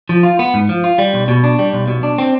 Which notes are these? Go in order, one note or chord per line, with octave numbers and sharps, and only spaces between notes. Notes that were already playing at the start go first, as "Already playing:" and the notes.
F3
F4
B3
G#2
F3
F4
G3
B1
B2
D4
G3
B1
B2
D4
C4